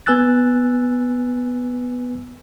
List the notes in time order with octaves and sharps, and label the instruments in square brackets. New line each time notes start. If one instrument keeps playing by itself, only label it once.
[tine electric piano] B3 B4 G#5 E6 F#6 A6